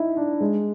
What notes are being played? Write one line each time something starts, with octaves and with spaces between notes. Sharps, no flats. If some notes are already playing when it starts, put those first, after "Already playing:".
Already playing: D#4 E4
D4
G#3